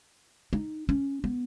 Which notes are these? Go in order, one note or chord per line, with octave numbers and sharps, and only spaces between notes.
D#4
C#4
B3